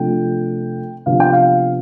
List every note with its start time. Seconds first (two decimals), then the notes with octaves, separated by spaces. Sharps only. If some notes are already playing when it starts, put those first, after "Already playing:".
Already playing: C3 F3 A3 D4 G5
1.06 C3 F3 B3 D4 F5
1.20 G5
1.33 F5